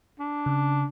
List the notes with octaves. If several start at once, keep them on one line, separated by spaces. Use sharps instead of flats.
D4
C#3